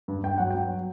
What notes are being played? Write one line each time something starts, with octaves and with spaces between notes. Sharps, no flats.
G2
G2 G5
F#3 F#5
F#3 G5